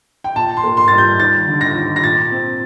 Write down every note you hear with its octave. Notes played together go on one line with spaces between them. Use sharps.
G5
A#2 A5
C6
A#3
C6
G3 A6
G6
D#2 A6
D3
A#6
D#2
A#6
A#2 A6
C4